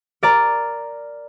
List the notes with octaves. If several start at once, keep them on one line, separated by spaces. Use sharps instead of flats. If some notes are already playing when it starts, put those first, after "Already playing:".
A#4 D5 A#5